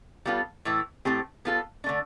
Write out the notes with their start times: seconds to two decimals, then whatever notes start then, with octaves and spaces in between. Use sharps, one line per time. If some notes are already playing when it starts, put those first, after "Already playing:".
0.25 G3 B3 F4 A4
0.65 A2 E3 A3 E4
1.05 A2 E3 A3 C4 G4
1.45 G3 B3 F4 A4
1.84 D3 A3 D4